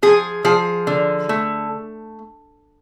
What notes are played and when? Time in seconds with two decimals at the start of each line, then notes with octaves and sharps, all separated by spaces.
0.02 F3 G#4
0.44 F3 G#4
0.87 D3
1.29 A3